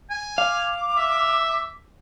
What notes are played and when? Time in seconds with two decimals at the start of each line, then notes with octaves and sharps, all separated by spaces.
0.10 G#5
0.38 F5 D6
0.97 E5